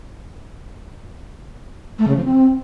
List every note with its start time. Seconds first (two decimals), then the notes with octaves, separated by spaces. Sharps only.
1.99 A3
2.08 C#3
2.16 F3
2.25 C4